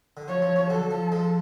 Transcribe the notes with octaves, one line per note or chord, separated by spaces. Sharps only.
D3
F3 C#5
F3
F3
D3 F#3 A4
F3
F3 G#3